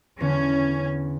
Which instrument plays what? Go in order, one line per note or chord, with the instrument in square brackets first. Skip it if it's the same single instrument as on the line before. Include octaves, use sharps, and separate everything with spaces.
[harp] E2 D3 [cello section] C#4